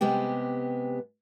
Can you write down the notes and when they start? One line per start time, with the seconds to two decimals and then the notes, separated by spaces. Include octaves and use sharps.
0.01 C3 G#3 B3 G4 G5